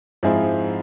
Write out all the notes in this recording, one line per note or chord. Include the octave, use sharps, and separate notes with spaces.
G#2 F3 C4 E4 G#4